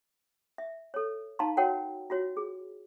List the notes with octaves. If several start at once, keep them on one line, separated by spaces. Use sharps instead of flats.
E5
A4 C#5
D#4 F5 A5 A#5 C6
F#4 A#4 C#5 F#5 G5
F4 F#4 C#5
G#4